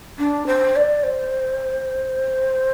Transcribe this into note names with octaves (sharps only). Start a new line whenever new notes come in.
D4
C5
D5
C5